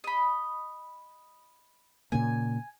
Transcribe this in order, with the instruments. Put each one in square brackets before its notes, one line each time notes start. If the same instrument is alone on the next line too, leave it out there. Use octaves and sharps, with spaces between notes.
[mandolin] D#5 B5
[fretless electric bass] A#2 C#3 A#3 [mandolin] G#5